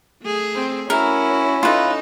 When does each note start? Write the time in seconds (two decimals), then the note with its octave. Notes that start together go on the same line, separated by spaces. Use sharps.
0.23 A3 G#4
0.55 C4
0.90 C#4 E4 F#4 A#4
1.63 D#4 F4 A4 B4